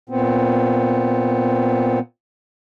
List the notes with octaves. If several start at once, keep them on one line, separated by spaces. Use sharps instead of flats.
A#2 B3 C4